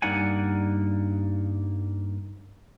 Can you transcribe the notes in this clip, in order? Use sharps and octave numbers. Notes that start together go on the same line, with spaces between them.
G2 A#3 D#4 D5 F#5 G#5